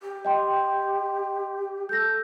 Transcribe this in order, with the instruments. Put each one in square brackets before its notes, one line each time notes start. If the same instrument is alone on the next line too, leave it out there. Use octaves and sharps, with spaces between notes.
[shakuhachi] G4
[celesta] D#5 G5 C6
[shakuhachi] A4 [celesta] G6 A#6